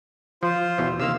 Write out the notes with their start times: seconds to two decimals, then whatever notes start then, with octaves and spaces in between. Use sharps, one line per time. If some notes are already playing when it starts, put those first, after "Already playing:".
0.43 F3 F4 C5
0.78 E2 B2 E3
1.00 C3 D#3 A#3 F5 E6